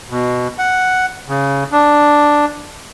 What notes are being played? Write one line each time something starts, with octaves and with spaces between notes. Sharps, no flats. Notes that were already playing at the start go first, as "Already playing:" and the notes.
B2
F#5
C#3
D4